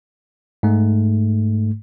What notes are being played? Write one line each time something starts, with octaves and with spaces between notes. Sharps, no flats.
G#2 A3